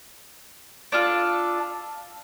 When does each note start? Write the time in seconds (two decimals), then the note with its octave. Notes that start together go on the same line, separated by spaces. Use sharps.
0.92 D4 F4 A4